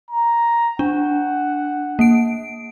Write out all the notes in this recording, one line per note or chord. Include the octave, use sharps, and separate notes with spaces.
A#5
D4 F#5
A#3 D7